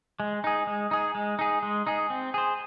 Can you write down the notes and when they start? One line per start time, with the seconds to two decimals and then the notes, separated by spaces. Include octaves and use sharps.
0.20 G#3
0.44 D#4 G#4
0.67 G#3
0.91 D#4 G#4
1.15 G#3
1.39 D#4 G#4
1.63 G#3
1.87 D#4 G#4
2.10 C4
2.34 G#4 C5